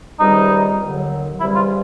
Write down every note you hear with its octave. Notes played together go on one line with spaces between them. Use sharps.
C#2 C3 D#3 G3 D#4
D#2 D3 F#3
C#2 C3 E3 G3 E4
F4